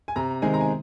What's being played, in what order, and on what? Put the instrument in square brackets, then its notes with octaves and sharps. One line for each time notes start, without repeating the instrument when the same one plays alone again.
[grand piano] G#5
C3 A#5
D#3 G#3 C4 D#4 G#5
A#5
G#5